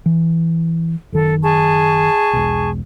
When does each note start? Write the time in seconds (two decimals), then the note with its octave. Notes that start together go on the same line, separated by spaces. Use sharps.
0.06 E3
1.12 F#1 D#3 A4
1.43 G#4 A5 C#6
2.33 E1 B1